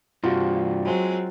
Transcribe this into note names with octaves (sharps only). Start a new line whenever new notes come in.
G2 C3 F4 F#4
F#3 G#3 C4